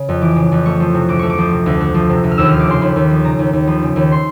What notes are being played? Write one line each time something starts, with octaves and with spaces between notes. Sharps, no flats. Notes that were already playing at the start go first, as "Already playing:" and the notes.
Already playing: C#3
F2
E3 D6
C#3
F2
A3 C#6
F3
C3
D2 D6
A3 C#6
D6
F3
C3
D2
A3
F3
C3
D2
F6
D#2 E6
F3 F6
D6
C#3 C6
D#2 B5
D#2
F3
C#3 A#5
D#2
D#2
F3 B5
C#3
D#2
C6